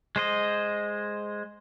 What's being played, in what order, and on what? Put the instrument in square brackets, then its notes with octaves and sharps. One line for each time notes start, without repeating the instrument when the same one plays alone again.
[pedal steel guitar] G#3 C5 D#5